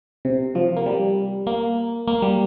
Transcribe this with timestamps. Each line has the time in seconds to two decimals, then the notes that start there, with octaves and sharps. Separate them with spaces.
0.25 C3
0.55 F3
0.77 A#3
0.86 G3
1.47 A#3
2.07 A#3
2.22 G3